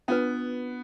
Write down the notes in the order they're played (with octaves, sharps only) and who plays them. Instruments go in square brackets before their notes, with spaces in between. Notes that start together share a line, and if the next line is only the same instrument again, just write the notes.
[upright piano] B3 [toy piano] D4 F4 B4